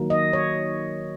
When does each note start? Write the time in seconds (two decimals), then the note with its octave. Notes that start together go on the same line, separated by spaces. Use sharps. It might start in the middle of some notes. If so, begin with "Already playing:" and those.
Already playing: D#3 F#3 A#3
0.10 D#5
0.33 C#5